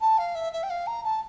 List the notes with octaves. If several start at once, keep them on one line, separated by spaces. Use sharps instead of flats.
A5
F5
E5
E5
G5
F5
A#5
A5